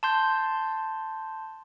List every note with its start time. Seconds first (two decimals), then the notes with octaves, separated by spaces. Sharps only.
0.03 A5 C6 G6